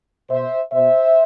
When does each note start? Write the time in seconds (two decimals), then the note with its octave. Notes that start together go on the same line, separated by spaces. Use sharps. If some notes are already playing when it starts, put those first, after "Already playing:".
0.30 B2 C5 E5
0.73 B2 C5 E5